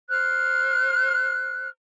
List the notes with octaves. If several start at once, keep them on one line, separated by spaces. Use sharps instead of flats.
C5 F6 F#6